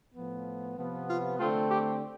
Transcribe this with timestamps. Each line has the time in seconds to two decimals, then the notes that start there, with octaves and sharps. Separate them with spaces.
0.14 A2 F3 B3
0.76 C3 F3 B3
1.08 F4
1.39 D3 A3 C4 F4
1.70 G4